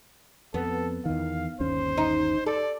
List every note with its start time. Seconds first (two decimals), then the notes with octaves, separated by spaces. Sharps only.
0.54 F2 B3 A4
1.05 E2 D#3 F5
1.60 G1 D#2 C#4 C5
1.98 D#4
2.46 A4 D5